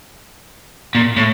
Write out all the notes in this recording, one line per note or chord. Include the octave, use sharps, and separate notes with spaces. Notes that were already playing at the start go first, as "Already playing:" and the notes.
A#2
A2